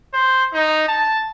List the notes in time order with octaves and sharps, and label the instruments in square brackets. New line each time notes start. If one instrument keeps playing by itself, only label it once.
[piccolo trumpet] C5
D#4
A5